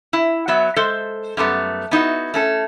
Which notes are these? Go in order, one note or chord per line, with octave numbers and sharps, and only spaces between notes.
E4
F#3 B3 E5
G#3 A4 C5 E5
F#2 G3 A3 B3
B3 D#4 E4 F#4
A3 C#4 A4